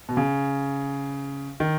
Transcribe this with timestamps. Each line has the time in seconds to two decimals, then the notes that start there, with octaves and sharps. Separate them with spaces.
0.09 B2
0.17 C#3
1.60 D#3